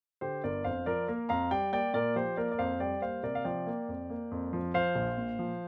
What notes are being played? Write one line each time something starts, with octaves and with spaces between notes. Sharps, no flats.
D3 G4 C5
G1 A#4 D5
F2 C5 F5
F3 A#4 D5
A#3 A#4
F2 F5 A#5
G3 D5 G5
A#3 D5 G5
A#2 A#4 D5
F3 G4 C5
A#3 A#4 D5
D5
F2 C5 F5
G3 D5 G5
A#3 C5 F5
C3 A#4 D5
F5
F3 D5 G5
A#3
F2
A#3
F2
F3
F3 C5 F5
A#1
A#2
F3